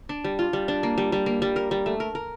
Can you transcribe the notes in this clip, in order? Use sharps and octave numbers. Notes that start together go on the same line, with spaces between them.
D4
G3
F4
G3
D4
A#3
G3
G3
A#3
G3
A#4
G3
A3
A#4
A#4